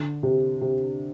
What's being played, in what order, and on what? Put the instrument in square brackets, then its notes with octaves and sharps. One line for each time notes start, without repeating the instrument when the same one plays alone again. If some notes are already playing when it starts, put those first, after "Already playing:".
Already playing: [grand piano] D3
C3
C3